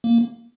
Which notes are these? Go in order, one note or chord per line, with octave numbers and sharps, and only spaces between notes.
A#3